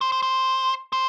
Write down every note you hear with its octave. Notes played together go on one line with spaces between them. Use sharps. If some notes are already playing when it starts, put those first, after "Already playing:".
C5
C5
C5
C5